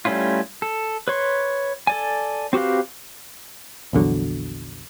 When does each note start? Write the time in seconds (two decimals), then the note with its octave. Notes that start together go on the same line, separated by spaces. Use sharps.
0.05 G3 A3 C#4 E4 F4
0.62 A4
1.08 B4 C#5 C6
1.87 A4 D5 G#5
2.53 C4 F#4 G4 B4 F5
3.93 A#1 E2 D3 F#3